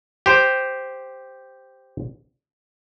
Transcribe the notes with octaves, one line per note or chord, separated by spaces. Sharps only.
G4 C5